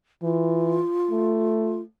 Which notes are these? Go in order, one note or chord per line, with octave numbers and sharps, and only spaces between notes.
E3 F4
A3